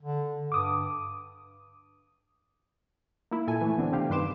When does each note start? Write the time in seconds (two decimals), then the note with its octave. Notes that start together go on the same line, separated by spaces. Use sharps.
0.02 D3
0.52 G2 D6 D#6
3.31 A#3 E4
3.47 A#2 A4 G#5
3.61 E3 A3
3.77 D2 B3 C4 D4
3.92 C3 C4 G4 F5
4.10 G2 D#3 B4 C6 D6 E7